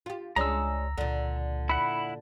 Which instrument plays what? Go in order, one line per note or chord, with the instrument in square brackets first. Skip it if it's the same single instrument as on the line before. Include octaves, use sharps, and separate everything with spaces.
[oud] F4 G4
[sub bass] C#2 [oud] G#3 C#4 D4 [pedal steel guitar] A#5 E6
[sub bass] C#2 [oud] A#2 D3
[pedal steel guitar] E4 F#5 [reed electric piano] B5